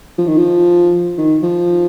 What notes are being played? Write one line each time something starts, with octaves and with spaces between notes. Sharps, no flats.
F3
D#3
F3
D#3
F3